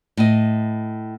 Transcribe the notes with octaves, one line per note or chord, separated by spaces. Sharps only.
A2 D#5